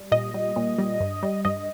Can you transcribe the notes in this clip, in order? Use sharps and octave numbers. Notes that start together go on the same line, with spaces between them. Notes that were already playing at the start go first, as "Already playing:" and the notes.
Already playing: G3
A#2 D#5
G3
A#2
G3
G2
G3
G2 D#5